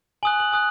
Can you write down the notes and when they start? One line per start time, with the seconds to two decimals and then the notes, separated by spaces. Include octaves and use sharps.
0.23 G#5 D#6 F#6 F#7
0.40 F#7
0.52 G#5 D#6 F#6